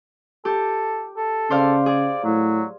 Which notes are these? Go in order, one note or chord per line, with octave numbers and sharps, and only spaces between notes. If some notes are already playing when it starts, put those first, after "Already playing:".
G4 A4
A4
C#3 C5 D5 F5
G#4 D5
A2 F#3